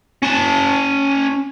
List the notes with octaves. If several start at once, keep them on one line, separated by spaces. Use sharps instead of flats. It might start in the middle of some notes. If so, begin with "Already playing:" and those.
C#4 A5